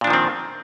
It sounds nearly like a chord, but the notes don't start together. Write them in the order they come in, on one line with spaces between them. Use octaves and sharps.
A#2 D4 F3 D#3 C4